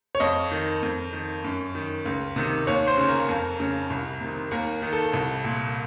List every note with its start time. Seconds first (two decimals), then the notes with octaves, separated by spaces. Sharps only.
0.15 C#5
0.20 F2 D#5
0.51 D#3
0.83 F2
1.13 D#3
1.44 F#2
1.75 D#3
2.06 C#2
2.36 C3 D#3
2.67 D#2 C#5
2.87 C5
2.98 C#3
3.08 A#4
3.29 F2
3.60 C#3
3.90 C2
4.21 C3 D#3
4.51 D#2 A#4
4.82 D#3
4.93 A4
5.13 C2
5.44 A#2